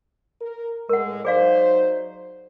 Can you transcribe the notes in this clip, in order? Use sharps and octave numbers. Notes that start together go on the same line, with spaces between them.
A#4
A2 G#3 A#4 F#5
F#3 D#4 G#4 C5 D5 F5